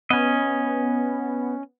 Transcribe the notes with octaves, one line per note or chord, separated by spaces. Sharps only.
B3 C#4 D#5